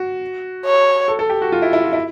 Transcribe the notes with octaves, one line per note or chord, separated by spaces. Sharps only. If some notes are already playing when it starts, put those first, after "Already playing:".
Already playing: F#4
C#5
A4
A4
G4
F#4
F4
E4
E4
F4
E4